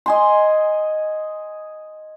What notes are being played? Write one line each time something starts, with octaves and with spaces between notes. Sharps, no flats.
D#5 G#5 C6